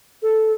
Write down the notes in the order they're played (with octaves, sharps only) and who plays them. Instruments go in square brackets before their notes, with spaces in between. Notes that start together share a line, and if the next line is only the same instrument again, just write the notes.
[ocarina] A4